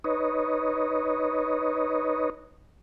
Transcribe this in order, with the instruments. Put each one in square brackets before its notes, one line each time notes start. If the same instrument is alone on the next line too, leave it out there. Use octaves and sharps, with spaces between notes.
[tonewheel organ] D#4 B4 C#5 D#5